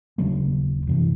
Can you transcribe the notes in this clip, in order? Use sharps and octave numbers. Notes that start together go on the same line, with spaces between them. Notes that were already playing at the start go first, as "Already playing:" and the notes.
D#1 C#3 F#3 A#3
F#2 C3 E3